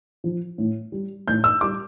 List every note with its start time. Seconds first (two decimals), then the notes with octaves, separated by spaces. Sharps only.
0.24 F3
0.58 A2
0.92 G3
1.27 A2 G6
1.44 E6
1.61 G3 D6